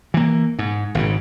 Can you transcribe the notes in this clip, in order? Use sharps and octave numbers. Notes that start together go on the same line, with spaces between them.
E3 A#3
G#2
G#1 G#2 C#3